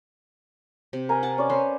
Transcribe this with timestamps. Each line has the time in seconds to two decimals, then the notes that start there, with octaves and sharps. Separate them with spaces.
0.93 C3
1.09 A#4 G#5
1.23 F#5 A5
1.38 C#4 D5
1.50 C#4 B4 C5